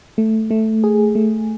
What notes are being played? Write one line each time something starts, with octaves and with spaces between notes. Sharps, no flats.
A3
A3
G#4
A3